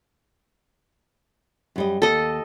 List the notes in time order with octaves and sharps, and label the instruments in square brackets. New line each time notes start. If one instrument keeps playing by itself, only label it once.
[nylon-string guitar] F#2 G3 D#5
[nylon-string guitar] D#2 [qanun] A4 D#5